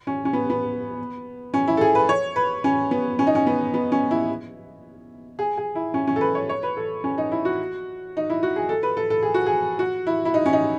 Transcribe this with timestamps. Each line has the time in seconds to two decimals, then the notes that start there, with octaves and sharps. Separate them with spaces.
0.07 C#4
0.25 C#4
0.33 B3
0.50 B3
1.54 C#4
1.68 E4
1.77 A4
1.81 G#4
1.95 B4
2.09 C#5
2.36 B4
2.64 C#4
2.91 B3
3.19 C#4
3.27 D#4
3.35 C#4
3.47 B3
3.74 B3
3.92 C#4
4.11 E4
5.39 G#4
5.57 G#4
5.75 E4
5.94 C#4
6.07 C#4
6.16 A4
6.21 B4
6.35 C#5
6.49 C#5
6.63 B4
6.77 A4
7.04 C#4
7.18 D#4
7.32 E4
7.45 F#4
8.17 D#4
8.30 E4
8.43 F#4
8.56 G#4
8.69 A4
8.83 B4
8.97 A4
9.10 A4
9.23 G#4
9.34 F#4
9.46 G#4
9.79 F#4
10.07 E4
10.25 E4
10.34 D#4
10.46 C#4
10.53 D#4